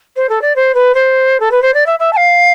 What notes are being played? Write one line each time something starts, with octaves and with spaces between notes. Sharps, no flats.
C5
A4
D5
C5
B4
C5
A4
B4
C5
D5
E5
E5
A5
F5